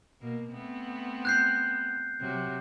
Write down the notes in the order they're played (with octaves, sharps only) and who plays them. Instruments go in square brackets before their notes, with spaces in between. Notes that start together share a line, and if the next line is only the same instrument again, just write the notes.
[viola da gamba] B2 A#3
A3 B3 C4
[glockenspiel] F#6 G6 C7
[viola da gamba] C3 F#3